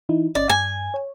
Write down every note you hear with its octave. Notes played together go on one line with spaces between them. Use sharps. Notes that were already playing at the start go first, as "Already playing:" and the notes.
E3 D#4 E4
G1 C#4 D5 D#5
G2 G#5
C#5